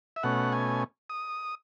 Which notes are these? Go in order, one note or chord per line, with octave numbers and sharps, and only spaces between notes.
E5
B2 A3 C#4 F#5
G#5
D#6